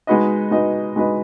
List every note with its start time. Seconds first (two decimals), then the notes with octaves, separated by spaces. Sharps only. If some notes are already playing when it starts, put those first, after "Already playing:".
0.07 G#3 D#4 F#4 B4 D#5
0.51 G#3 D#4 F#4 B4 D#5
0.96 G#3 D#4 F#4 B4 D#5